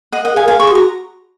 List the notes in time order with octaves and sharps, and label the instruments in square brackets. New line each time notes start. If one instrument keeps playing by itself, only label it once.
[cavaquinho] D#5 F#5
[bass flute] A#4 [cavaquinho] D#5 F#5
[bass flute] G#4 [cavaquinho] F5 G#5
[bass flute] A#4
[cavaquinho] F5 G#5
[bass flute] G#4 [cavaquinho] C#6
[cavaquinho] C6
[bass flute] F#4 [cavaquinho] A#5